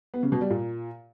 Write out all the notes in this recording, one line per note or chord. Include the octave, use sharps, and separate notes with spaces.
B3
C#3
B2
G3
A#2